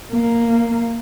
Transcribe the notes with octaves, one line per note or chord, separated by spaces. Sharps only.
A#3